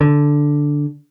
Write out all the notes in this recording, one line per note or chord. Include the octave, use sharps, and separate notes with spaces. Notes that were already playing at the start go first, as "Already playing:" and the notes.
D3